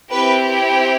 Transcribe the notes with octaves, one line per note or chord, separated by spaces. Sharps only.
C4 E4 G4 B4